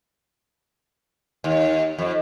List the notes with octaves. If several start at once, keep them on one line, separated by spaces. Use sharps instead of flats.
D#2
F2